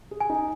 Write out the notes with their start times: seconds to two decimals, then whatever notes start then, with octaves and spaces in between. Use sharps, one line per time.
0.11 G#4
0.20 G#5
0.30 D#4